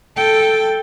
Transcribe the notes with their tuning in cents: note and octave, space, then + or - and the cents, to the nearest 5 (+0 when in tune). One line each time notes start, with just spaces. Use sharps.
A4 +0 G5 +0